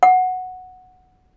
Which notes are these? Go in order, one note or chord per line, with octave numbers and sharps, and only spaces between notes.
F#5